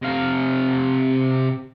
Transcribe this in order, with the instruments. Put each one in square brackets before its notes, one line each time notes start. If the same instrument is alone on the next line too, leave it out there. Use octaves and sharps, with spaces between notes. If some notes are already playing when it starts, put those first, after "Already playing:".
[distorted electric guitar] C3 F5